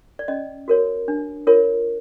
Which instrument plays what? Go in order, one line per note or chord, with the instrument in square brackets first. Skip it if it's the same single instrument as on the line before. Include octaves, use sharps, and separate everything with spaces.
[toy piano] D5
C#4 D#5
F#4 A#4 C#5
D4
F4 A#4 C#5